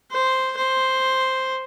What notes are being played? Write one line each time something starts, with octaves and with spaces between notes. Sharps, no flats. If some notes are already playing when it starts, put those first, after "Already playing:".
C5
C5